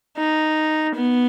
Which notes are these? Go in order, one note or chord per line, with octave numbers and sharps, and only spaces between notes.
D#4
B3